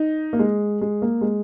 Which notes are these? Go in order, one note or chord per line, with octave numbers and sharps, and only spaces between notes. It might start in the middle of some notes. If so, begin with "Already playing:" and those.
Already playing: D#4
A#3
G#3
G#3
A#3
G#3